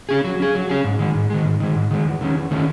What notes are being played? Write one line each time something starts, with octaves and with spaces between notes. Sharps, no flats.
C#4 G#4
F#3
C#4 G#4
F#3
C#4 G#4
G#2
D#3 G#3
G#2
D#3 G#3
G#2
D#3 G#3
G#2
D#3 G#3
E2
D#3 A3 C#4
E2
D#3 A3 C#4